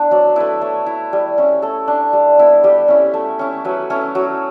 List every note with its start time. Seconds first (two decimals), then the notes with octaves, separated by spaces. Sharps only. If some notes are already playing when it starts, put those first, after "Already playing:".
Already playing: B3 D4 E4
0.11 F#3 D5
0.36 A3 E4 B4
0.61 A3 C#5
0.86 E4
1.13 G3
1.38 C#4 E4
1.62 A3 A4
1.88 D4
2.13 G3
2.38 B3 E4
2.63 G3 G4
2.88 C#4 E4
3.14 A3
3.39 C#4 E4
3.65 F#3 B4
3.90 A3 C#4 E4
4.15 F#3